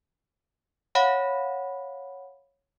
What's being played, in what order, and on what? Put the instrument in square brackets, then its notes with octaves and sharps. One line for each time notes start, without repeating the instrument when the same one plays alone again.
[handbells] C#5 F5 F#5 B5